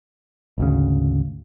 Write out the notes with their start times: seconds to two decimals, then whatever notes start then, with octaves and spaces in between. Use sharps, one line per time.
0.58 G#1 D2 C#3